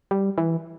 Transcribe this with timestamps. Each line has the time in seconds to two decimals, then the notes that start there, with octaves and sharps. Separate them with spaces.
0.11 G3
0.38 E3